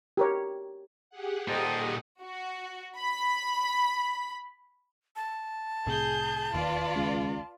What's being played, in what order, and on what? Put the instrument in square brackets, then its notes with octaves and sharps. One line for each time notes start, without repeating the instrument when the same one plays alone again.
[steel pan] G4 A#4 C#5
[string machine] G4 G#4 F#5
[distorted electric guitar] A#2 D#4 [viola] A4 D#5 [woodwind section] C5 G5 A5
[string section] F#4
B5
[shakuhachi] A5
[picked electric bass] C2 A2 C3 [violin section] G#4 G6
[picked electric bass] E1 D#2 D#3 [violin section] F4 B4 D5
[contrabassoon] C#2